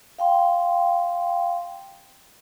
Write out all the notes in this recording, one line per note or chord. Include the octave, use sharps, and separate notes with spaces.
F5 G5 C6